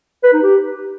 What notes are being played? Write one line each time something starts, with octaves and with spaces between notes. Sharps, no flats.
B4
D#4
G4